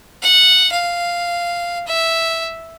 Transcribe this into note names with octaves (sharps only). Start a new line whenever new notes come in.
F#5
F5
E5